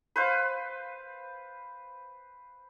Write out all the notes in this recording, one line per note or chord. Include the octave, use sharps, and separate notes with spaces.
B4 C5 F5